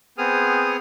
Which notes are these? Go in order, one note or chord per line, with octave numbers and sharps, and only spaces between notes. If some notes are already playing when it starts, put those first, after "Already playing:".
B3 C4 G#4 D#6 F6